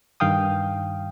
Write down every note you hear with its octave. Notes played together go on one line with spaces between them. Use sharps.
G2 D#3 F5 G5 D#6